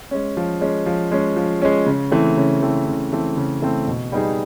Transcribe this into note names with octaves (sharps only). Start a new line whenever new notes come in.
G#3 C#4
F3
G#3 C#4
F3
G#3 C#4
F3
G#3 C#4
C#3
E3 A3 C4
C#3
E3 A3 C4
C#3
E3 A3 C4
C#3
E3 A3 C4
B2
G3 B3 D#4 G#4